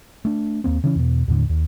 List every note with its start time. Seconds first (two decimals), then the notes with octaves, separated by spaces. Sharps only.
0.25 A3 D4
0.64 D#2 A2 A#3 C4
0.84 C#3 E3 C#4
0.96 E2 B2
1.28 D#2 A2 D3
1.49 D#2